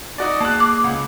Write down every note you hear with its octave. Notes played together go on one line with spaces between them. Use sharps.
D#4 F#4 D5
A#3 G#4 A5 F#6
D6 F#6
C#2 F#5